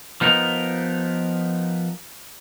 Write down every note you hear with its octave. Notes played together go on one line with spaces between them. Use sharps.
F3 B3 D#4 A#4